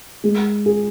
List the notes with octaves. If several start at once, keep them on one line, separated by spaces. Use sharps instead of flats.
G#3
G#4